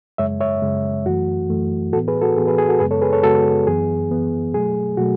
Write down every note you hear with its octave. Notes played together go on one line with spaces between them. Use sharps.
F#2 C#3 G#3 C#5 E5
C#5 E5
F#2 C#3 G#3
F#2 E3 A3 F#4
F#2 E3 A3
A2 E3 B3 F#4 A4
G#4 B4
F#4 A4
A2 E3 B3 G#4
G#4 B4
G#4
F#4 A4
F#2 C#3 G#3 B3 G#4 B4
A4 C#5
G#4 B4
A4 C#5
F#2 C#3 G#3 B3 F#4 A4
F#2 E3 B3 G#4
F#2 E3 B3
B2 F#3 A3 G#4
B2 F#3 A3 F#4